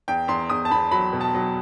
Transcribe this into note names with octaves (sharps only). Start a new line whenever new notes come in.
E2 G5
E2 C6
E2 D#6
A5
E2 B5
F#3 B5
B2
A5
F#3